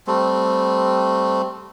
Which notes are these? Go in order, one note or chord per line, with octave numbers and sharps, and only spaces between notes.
G3 A3 C4